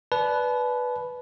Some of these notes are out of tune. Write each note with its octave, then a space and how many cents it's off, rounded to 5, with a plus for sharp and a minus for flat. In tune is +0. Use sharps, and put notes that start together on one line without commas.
B4 +0 D5 +0 A5 -35